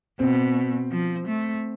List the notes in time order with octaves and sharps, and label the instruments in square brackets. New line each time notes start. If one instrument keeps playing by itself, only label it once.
[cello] B2 [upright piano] C4
[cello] F3
A3